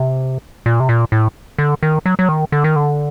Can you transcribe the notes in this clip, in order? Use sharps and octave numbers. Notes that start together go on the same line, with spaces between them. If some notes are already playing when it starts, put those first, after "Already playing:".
Already playing: C3
A#2
C3
A#2
A2
D3
D#3
F#3
F#3
D#3
D3
D#3
D3